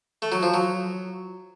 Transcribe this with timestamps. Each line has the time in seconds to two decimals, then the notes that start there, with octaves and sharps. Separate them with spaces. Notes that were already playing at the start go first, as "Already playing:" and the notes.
0.22 A3
0.32 F#3
0.43 F3
0.54 F#3